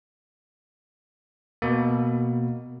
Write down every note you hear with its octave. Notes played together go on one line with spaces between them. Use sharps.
B2 A#3